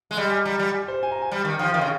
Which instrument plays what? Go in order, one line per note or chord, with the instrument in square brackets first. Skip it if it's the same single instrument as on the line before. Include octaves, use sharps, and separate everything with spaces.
[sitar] G#3
[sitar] G3 [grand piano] D#5
[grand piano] G#5
[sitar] G3 [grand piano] A#5
[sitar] G3
[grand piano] G#5
C5
G#5
A#5
G#5
[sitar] G3
D#3
[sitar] F3 [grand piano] G5
[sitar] D#3 [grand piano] F5
[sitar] C#3